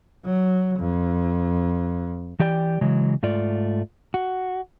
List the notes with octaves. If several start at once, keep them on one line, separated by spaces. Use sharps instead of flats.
F#3
F2
E3 G4 D5 G5
C#3 E3 F#3 G#3
G#2 A3 F4 D5
F#4